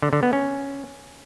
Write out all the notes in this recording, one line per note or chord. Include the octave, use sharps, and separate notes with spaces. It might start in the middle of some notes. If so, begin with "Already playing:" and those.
D3
D3
B3
C#4